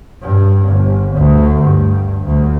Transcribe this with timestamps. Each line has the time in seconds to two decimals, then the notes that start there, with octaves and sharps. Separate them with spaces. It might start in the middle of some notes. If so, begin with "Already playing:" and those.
0.22 G2
0.68 G1
1.14 D2
1.62 G2
2.24 D2